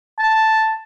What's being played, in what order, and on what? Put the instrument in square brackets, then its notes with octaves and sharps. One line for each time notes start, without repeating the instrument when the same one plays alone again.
[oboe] A5